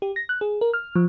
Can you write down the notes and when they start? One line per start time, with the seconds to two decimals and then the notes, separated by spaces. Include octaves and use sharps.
0.02 G4
0.16 A#6
0.29 F#6
0.41 G#4
0.61 A#4
0.74 F6
0.96 F3